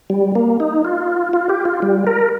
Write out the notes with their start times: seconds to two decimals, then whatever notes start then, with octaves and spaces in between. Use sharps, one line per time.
0.10 G3
0.35 A#3
0.60 D#4
0.85 F4
1.33 F4
1.49 G4
1.65 F4
1.82 G3
2.07 A#4